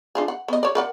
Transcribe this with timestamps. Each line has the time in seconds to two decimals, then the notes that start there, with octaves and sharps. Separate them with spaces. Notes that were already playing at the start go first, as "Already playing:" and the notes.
0.15 D4 F4 G#4
0.28 F#5
0.48 B3 D#5
0.63 C#5 D5
0.75 A#4 D5 F#5